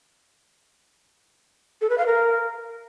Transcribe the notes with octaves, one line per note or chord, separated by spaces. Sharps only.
A4
B4
F5
A#4